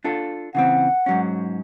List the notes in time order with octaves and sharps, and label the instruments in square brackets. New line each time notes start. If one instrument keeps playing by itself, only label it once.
[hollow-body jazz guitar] D4 F4 A4
[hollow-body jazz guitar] C#3 E3 C4 [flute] F#5
[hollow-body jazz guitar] G#2 F#3 C#4